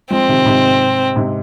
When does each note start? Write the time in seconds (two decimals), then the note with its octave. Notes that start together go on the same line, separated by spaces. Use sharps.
0.11 F3 G#3 C4
0.28 C3 D#3
0.45 G#2 C3
1.16 G#2 C3